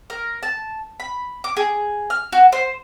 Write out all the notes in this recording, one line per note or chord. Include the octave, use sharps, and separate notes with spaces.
A#4
A5
B5
D6
G#4
F6
F#4
C5